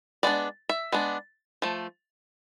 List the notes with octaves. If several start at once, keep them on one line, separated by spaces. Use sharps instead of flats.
G#3 B3 D4 D5
E5
G#3 B3 D4
F3 A3